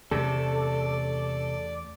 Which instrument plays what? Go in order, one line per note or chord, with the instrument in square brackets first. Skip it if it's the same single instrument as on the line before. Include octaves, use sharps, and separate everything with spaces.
[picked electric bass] E2 A3 C#4 [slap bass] C3 [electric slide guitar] A4 [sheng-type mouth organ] D5